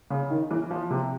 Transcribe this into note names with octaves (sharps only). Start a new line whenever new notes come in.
C#3
D#3
E3
F3
C3